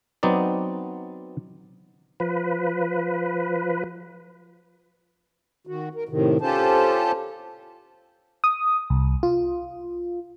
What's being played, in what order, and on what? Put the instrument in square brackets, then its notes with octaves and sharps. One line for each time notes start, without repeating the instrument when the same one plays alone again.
[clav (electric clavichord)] F#3 B3 C4 D#4 D5
[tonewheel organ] F3 B4
[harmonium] D#3 F#4
A#4
A2 C3 D#3
C#4 F4 G4 A4 C5 A5
[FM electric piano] D#6
C2
F4